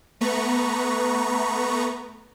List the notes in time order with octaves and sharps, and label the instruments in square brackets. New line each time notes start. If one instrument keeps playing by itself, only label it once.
[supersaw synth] A3 B3 B4 A#5 C#6